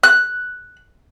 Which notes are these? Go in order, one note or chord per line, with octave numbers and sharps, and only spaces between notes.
F#6